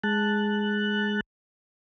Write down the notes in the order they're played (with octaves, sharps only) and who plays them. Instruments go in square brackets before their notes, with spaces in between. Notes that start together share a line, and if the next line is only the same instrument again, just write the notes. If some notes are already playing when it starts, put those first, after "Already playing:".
[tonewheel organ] G#3 A5 F#6